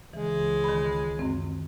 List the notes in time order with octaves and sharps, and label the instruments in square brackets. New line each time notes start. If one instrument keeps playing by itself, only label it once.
[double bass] C#2 [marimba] E3 [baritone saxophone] G#3
[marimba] D#3 B5
F#2 D#3 C4